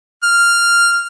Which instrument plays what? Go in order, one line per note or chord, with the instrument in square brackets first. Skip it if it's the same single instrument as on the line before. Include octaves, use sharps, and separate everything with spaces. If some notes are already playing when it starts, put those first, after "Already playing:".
[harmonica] F6